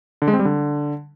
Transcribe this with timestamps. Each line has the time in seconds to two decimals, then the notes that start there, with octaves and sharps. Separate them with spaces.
0.22 D3
0.28 G#3
0.33 C4
0.39 G3
0.45 D3